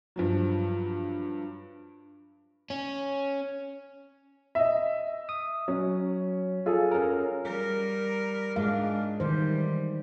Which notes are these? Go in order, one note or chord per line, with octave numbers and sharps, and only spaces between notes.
G2 F3 F#3
C#4
D#5 E5
D#6
F#3 C#4
F4 G#4 A4
C#4 A#4
G3 A#4
G#2 G#3 D4 F5
D#3 E3 G3 C5